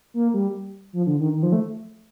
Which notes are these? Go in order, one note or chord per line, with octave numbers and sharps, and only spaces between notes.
A#3
G3
F3
D3
D#3
D#3
F3
A3